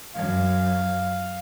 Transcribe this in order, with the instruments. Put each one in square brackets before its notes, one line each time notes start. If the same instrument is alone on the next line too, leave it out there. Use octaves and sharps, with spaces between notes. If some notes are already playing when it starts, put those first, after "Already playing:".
[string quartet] F#2 [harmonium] F5